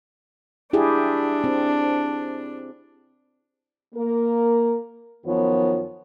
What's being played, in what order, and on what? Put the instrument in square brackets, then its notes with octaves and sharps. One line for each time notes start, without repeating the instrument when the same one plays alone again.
[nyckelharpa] D4 [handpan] E4 G4 G#4
[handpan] C4
[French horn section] A#3 A#4
F#2 D#3 F3 B3 F4 C#5